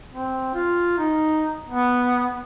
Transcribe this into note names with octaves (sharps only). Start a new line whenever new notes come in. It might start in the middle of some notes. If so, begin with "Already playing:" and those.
C4
F4
D#4
B3